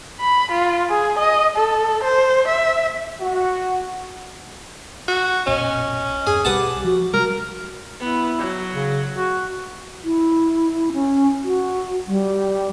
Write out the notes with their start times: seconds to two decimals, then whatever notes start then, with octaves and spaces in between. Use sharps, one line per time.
0.20 B5
0.51 F4
0.90 G#4
1.19 D#5
1.56 A4
2.03 C5
2.48 E5
3.21 F#4
5.08 F#4
5.47 F#1 B1 A#2 C#4 D#5
6.27 E2 G2 G#4
6.45 B1 G3 G4 B4 F#5 A5
6.84 F3 F#4
7.13 C3 G3 G#3 A#4
8.00 B3 E4
8.39 F#3
8.73 C#3
9.14 F#4
10.04 E4
10.93 C#4
11.44 F#4
12.07 G3